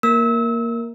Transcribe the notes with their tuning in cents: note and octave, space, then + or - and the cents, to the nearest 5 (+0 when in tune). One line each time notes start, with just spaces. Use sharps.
A#3 +0 A#4 +0 E6 -30